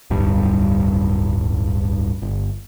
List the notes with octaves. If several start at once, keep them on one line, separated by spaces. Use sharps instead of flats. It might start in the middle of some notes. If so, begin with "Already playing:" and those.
D1 B1 G2 G3
G1